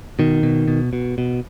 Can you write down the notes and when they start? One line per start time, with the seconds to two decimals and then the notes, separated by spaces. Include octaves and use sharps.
0.19 B2 D#3
0.43 B2
0.68 B2
0.93 B2
1.18 B2